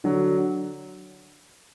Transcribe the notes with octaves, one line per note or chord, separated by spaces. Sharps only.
D3 F#3